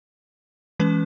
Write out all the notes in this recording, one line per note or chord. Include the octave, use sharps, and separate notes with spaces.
E3 G#3 C#4 B4